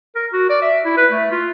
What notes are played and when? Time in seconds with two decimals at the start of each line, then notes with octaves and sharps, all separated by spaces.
0.15 A#4
0.33 F#4
0.50 D5
0.62 E5
0.85 E4
0.97 B4
1.12 A3
1.32 F4